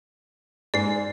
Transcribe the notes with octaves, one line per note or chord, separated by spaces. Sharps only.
G#2 D5 C7